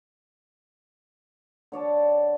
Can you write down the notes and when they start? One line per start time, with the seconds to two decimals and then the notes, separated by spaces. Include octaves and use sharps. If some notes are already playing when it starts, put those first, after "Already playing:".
1.72 D3 C#5 D5 A5